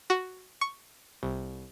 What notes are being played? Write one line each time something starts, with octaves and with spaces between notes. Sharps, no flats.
F#4
C#6
C2